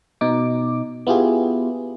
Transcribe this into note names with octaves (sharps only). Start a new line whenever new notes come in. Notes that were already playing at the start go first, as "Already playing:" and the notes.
B2 D#4 D6
B3 E4 F4 G4 G#4